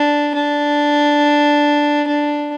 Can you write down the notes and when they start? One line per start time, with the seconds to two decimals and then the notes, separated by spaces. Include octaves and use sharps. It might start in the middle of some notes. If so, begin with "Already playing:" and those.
Already playing: D4
0.35 D4
2.08 D4